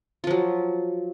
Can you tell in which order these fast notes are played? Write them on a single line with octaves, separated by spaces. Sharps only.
F4 F3 F#3